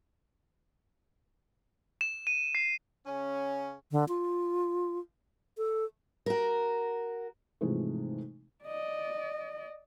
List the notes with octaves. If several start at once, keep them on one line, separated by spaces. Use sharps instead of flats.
E7
D#7
C7
C#3 C#4
D3
F4
A4
F#4 A#4
G#2 C3 E3 F3 G#3 A3
D5 D#5